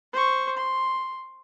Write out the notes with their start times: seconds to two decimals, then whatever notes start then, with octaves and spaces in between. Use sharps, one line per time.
0.13 C5 C#6
0.57 C6